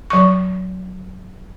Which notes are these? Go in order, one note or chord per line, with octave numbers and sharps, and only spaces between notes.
F#3 C#6